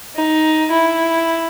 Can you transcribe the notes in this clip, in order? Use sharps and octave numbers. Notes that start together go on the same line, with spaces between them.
D#4
E4